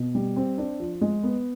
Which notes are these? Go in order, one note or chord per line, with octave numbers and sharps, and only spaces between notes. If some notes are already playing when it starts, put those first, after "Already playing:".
Already playing: B2
G3
C4
D4
F3
G#3
B3